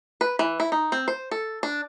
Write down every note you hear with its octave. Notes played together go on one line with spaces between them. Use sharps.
B4
E3
E4
D#4
C4
C5
A4
D4